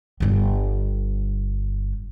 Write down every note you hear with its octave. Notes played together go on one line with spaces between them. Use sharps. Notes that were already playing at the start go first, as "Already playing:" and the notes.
G1 G3